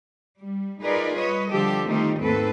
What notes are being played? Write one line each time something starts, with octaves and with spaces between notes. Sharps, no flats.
G3
D#4 F4 G#4 A#4 B4 D5
G3 B4 C#5 D#5
D3 F3 G3 G4 A4
D#3 A3 C4 D#4 F4 G4
D#2 G#2 A3 C4 A4 B4